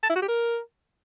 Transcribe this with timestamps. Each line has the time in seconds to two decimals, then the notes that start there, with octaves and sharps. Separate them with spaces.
0.03 A5
0.09 E4
0.16 F#4
0.22 G4
0.28 A#4